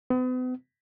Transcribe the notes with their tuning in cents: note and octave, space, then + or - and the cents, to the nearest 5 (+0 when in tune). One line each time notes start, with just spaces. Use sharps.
B3 +40